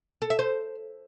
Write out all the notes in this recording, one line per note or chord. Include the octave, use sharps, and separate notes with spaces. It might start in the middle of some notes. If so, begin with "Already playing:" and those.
A4
E5
C5